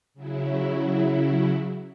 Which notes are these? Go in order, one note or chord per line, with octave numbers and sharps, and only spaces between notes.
C#3 F#3 E4